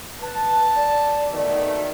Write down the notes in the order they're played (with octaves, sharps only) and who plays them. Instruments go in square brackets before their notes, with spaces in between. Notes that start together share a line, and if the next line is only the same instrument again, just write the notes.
[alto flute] B4 [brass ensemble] A5
[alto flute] D5
[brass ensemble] B2 D#3 A3